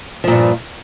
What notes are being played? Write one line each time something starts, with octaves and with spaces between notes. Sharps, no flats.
G2 A#2 F3